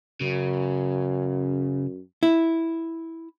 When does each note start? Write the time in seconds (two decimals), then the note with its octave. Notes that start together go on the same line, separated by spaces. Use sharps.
0.21 F#2 C#3
2.23 E4